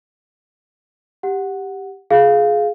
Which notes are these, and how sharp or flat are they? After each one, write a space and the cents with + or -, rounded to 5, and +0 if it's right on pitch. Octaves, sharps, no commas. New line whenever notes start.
G4 +0 F#5 +0
F4 +30 G#4 +15 F5 +0